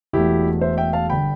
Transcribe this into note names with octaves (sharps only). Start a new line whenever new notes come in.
E1 E2 B2 A3 E4 G4
C5 E5
E5 G5
F5 A5
G1 D3 G5 B5